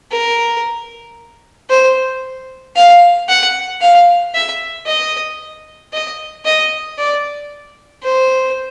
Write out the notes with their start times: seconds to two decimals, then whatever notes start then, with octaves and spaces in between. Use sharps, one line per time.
0.11 A#4
1.70 C5
2.76 F5
3.29 F#5
3.81 F5
4.34 E5
4.86 D#5
5.93 D#5
6.45 D#5
6.98 D5
8.04 C5